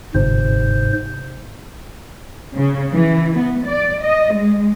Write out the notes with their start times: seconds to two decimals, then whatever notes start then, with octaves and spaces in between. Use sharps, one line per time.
0.15 G1 G#2 C3 C5
2.58 C#3
2.93 E3
3.38 B3
3.67 D5
4.03 D#5
4.34 G#3